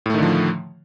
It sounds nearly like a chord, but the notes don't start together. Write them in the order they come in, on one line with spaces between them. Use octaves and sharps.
A2 A3 D#3 D3 F3